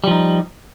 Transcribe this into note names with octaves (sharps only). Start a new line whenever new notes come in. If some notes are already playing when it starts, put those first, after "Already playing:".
F3 G3 D#4